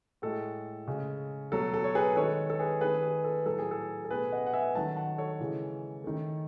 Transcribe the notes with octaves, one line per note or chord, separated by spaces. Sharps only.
A2 G#3 A4
C#3 G#3
B2 F#3 A3 A4
A4
C#5
G#4 B4
D#3 G#3 A4 C#5
A4
G#4 B4
D#3 A3 G#4 B4
G#4
A4
A2 F#3 A3 A4
G#4
A4
A4
B2 A3 G#4 B4
D#5 F#5
F#5
E5 G#5
D#3 F#3 A3 F#5 A5
F#5 A5
A4 C#5
C#3 E3 G#3
D#3 A3